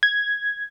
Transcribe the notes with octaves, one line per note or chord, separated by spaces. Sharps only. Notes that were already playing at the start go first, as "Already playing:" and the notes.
G#6